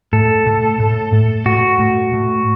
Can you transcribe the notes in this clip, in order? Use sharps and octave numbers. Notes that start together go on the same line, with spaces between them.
A2 A4
A2
A2
A2
A2 F#4
A2
A2